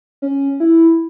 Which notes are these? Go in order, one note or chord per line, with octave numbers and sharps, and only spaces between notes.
C#4
E4